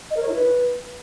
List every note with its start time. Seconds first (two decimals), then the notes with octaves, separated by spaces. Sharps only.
0.10 D#5
0.17 A#4
0.23 C#5
0.29 E4
0.35 B4